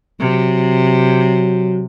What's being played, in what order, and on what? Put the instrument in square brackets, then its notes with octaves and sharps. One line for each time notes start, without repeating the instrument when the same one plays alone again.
[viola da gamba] C3 [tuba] F#3